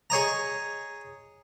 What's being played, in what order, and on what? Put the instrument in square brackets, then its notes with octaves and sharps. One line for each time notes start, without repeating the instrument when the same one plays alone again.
[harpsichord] G#4 C#5 D#5 A#5